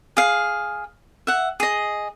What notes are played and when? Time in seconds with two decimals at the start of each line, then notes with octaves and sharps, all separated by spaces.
0.17 G#4 F5
1.27 E5 F#5
1.60 G#4 D#5